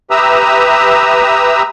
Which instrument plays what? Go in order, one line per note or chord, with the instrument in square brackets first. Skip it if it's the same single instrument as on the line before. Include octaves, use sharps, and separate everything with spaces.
[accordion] G4 B4 E5 A#5 D#6 E6